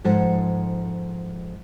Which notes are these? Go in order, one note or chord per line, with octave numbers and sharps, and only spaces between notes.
G#2 F3 A4 F#5